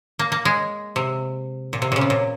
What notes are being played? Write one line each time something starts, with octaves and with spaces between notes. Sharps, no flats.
A#3
A#3
G#3
C3
A#2
C3
A#2 C#3
C3
A#2